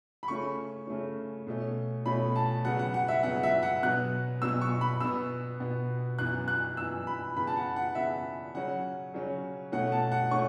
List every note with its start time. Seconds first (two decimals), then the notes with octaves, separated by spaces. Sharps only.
0.23 B5
0.28 C#3 A3 C#4 C#6
0.87 C#3 A3 C#4
1.47 B2 A3 C#4
2.06 B2 A3 C#4 B5
2.36 A5
2.64 C#3 F#3 B3 F#5
2.79 F#5
2.94 F#5
3.08 E5
3.23 C#3 F#3 B3 F#5
3.43 E5
3.63 F#5
3.83 B2 F#3 B3 F#6
4.42 B2 F#3 B3 E6
4.61 C#6
4.81 B5
5.00 B2 B3 E6
5.60 B2 B3
6.19 F#2 E3 B3 F#6
6.48 F#6
6.77 F#2 E3 B3 E6
7.07 B5
7.37 C#3 E3 B3 B5
7.47 A5
7.56 F#5
7.76 F#5
7.95 C#3 E3 B3 E5
8.54 C#3 F#3 C#4 F#5
9.14 C#3 F#3 C#4
9.72 B2 A3 C#4 F#5
9.92 A5
10.12 F#5
10.31 A3 C#4 C#6